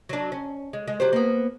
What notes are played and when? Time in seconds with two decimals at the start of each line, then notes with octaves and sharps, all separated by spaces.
0.09 F#3 D4
0.32 C#4
0.73 G#3
0.88 G#3
1.00 F#3 G4 C5
1.13 A#3 B3